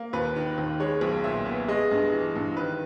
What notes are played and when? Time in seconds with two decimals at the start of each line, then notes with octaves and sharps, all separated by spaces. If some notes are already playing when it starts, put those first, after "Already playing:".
Already playing: A#3
0.13 D#2 B4
0.36 D#3
0.58 D#2
0.80 G#3 C#5
1.01 B1
1.24 A#2 E5
1.46 B3
1.68 G#3 D#5
1.91 G2
2.13 E3
2.35 G2
2.57 D#3 B4